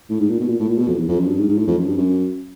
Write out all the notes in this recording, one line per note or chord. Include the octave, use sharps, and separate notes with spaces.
A2
G#2
A#2
B2
A#2
A2
A#2
B2
F2
E2
F2
F#2
G2
G#2
G#2
A2
F2
F#2
G2
F#2